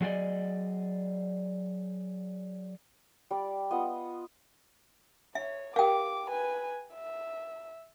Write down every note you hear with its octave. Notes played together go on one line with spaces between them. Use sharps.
F#3 G#4 A#4 D5 D#5
G3 D5
B3 F4 D#5
C#5 E5
G4 A#4 F5 G5 D6
B4 G#5
E5